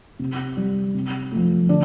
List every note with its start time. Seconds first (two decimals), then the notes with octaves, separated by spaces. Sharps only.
0.19 C3
0.57 G3
0.94 C3
1.32 F3 A3
1.69 D3 D4